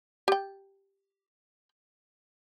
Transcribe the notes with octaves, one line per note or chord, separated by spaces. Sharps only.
G4 G5